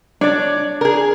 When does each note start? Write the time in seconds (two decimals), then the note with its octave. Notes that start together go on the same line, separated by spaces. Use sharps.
0.21 D4 C#5 D5
0.81 G#4 A#4